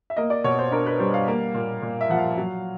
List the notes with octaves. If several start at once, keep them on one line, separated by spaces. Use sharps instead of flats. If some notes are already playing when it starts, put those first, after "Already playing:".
E5
A#3 D#5
D5
B2 C#5
C5
D4 A#4
B4
G3 C5
F5
A#3
A#2
A#2
E5
F3 F#5
F5
F#3